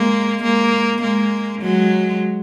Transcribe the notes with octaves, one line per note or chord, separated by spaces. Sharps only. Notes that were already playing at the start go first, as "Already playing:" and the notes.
Already playing: G#3 A#3
G#3 A#3
G#3 A#3
F#3 G#3